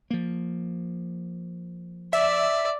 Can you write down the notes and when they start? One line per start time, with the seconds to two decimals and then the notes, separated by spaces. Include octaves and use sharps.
0.11 F3 A#3
2.13 D5 E5